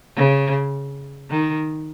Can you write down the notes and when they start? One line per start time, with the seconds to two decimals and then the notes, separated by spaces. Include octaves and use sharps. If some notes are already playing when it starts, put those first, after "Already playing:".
0.16 C#3
1.30 D#3